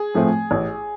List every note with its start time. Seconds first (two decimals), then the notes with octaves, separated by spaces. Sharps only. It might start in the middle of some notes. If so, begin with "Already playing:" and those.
Already playing: G#4
0.14 A2 F3 A3 C4
0.51 A1